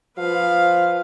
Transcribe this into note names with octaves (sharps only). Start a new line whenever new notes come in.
F3 B4 F5